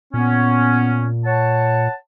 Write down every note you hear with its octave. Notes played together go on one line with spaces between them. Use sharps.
A#2 B3 C#4
C#5 F#5 A5